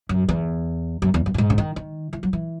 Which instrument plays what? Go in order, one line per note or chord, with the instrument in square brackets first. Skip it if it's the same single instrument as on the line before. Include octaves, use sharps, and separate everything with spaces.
[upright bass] F#2
E2
F#2
E2
F#2
A2
G#2
C#3
D#3
D#3
E3
F#3
E3